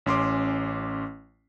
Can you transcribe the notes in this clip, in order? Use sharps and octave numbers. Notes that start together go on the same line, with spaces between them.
A1 C#4 C6 D6